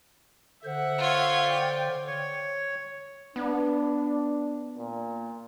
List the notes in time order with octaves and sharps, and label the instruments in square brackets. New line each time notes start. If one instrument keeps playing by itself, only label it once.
[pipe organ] D3 C5 [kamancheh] E5 F#5
[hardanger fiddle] F4 C#5
[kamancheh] D5 G5
[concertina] C#5
[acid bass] B3 [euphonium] D4
[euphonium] A#2